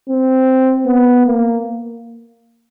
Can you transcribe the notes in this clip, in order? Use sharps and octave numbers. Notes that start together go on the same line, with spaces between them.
C4
B3
A#3